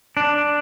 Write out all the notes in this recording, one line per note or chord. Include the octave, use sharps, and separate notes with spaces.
D4